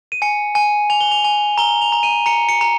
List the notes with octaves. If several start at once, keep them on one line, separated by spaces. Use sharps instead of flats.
D#7
G#5 C#7
G#5
G#5 F7
G7
F7
G#5
A#5 G7
F7
A#5
D#7
A#5 C#7
C#7
A#5